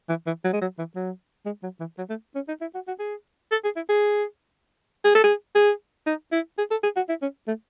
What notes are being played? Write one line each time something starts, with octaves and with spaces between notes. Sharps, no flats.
E3
E3
F#3
G#3
F#3
E3
F#3
G#3
F#3
E3
F#3
A3
C#4
D#4
E4
F#4
F#4
G#4
A4
G#4
E4
G#4
G#4
A4
G#4
G#4
D#4
E4
G#4
A4
G#4
F#4
E4
C#4
A3